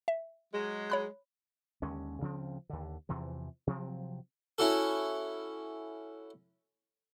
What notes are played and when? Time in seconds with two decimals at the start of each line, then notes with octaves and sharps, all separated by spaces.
0.08 E5
0.53 F#3 G#3
0.90 C#5 B5 F#6
1.82 D#2 D3 G#3 C#4
2.20 D2 C#3 F3 C4
2.70 D#2 D3
3.09 E2 C3 E3 F3
3.67 C3 F3 F#3 C4
4.58 C#4 E4 F#4 A4